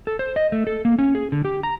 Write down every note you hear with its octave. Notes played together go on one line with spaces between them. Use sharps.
A4
C5
D#5
A3
A4
A#3
C#4
G#4
D3
G4
A#5